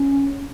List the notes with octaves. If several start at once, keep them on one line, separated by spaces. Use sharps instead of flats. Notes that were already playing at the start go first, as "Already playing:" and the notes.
Already playing: C#4